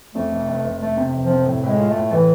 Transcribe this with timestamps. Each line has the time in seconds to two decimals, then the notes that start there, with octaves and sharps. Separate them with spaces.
0.15 F2 A3
0.31 F1
0.48 F1
0.64 F1
0.81 F1 A3
0.97 C3
1.14 F1
1.25 F3
1.30 C3
1.46 A2
1.64 A2 G#3
1.80 F4
1.90 A3
1.96 A2
2.12 A2 E3